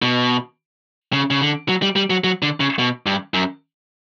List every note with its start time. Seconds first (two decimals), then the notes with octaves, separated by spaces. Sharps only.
0.02 B2
1.13 C#3
1.31 C#3
1.41 D3
1.69 F#3
1.82 G3
1.96 G3
2.10 F#3
2.24 F#3
2.42 D3
2.60 C#3
2.79 B2
3.06 G2
3.34 F#2